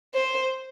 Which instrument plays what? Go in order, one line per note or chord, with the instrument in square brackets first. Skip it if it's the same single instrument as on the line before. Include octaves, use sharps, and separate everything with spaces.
[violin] C5